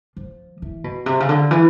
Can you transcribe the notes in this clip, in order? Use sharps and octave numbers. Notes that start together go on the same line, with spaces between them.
F3
E3
B2
C3
C#3
D3
E3